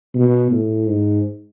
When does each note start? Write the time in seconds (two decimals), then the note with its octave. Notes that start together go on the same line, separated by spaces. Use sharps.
0.15 B2
0.52 A2
0.88 G#2